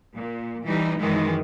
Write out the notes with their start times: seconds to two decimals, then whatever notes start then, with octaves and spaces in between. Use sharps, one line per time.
0.13 A#2
0.64 E3 G3 D#4
0.99 F#2 D#3 E3 G#3